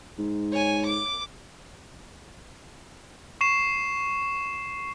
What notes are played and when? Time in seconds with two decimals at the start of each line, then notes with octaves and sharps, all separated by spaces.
0.18 G#2
0.52 C#5 G#5
0.86 D6
3.41 C#6 C7 E7